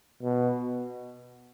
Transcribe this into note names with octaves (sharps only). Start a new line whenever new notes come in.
B2